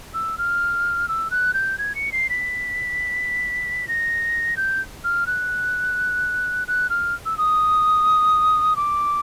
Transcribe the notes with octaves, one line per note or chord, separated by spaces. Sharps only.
E6
F6
E6
F#6
G6
G#6
C#7
C7
B6
A#6
G6
F6
F#6
F#6
F6
E6
D#6
D6